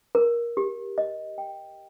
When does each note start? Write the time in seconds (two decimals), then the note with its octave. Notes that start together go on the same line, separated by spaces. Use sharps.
0.15 A#4
0.57 G4
0.98 D#5
1.38 G5